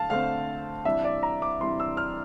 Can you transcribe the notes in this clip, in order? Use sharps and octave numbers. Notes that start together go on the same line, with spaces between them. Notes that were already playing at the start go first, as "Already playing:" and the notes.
Already playing: D3 A3 F5 A5
D3 A3 C4 F5
C3 E3 G3 D4 E5
D5
A#5
D6
C3 E3 G3 D4 C6
E6
F6